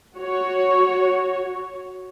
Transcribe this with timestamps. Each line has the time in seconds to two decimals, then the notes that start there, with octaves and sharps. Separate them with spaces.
0.18 F#4 C#5